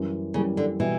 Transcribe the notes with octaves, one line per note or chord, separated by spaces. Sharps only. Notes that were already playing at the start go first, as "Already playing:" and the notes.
Already playing: F#2 E3 G3
F#2 C#3 E3 G3
D3
B2 E3 G3